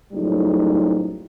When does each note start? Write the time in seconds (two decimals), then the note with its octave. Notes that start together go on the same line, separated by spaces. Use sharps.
0.13 F#1 F#2 A2 F3 G3 D#4